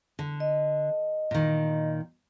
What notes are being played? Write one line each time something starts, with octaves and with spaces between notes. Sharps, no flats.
D3
D#5
A#2 D#3